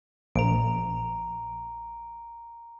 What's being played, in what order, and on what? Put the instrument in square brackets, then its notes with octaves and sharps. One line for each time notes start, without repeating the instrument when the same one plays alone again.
[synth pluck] A#1 [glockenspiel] A#5 D7